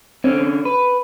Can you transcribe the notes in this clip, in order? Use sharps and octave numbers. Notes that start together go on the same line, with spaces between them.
D3 C4 C#4
B4